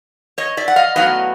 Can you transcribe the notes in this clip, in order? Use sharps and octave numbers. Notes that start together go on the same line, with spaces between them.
C#5 D#5
D5 E5
F#5
D#5 F5
A2 F#3 B3 D#5 F5